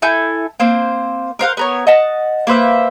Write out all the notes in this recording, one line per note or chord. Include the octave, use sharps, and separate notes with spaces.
E4 A4 G#5 G6
A#3 C4 C5 C6
A#4 C5 F5 F#5
B3 A#4 C#5
D#5 F#5 A5
A#3 B4 C5 E5